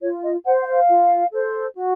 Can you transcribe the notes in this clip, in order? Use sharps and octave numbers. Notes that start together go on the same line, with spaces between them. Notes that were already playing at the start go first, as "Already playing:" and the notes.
F4 C#5
D#5
C5 F#5
F#5
F5
F4
A4 C5
F#4